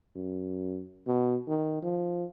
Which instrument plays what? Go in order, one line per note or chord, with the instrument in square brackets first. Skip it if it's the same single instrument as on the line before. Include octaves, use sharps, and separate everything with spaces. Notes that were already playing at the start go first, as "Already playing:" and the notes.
[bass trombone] F#2
B2
D#3
F3